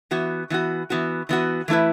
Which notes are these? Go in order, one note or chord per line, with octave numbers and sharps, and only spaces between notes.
E3 B3 F#4
E3 B3 F#4
E3 B3 F#4
E3 B3 F#4
E3 A3 E4 B4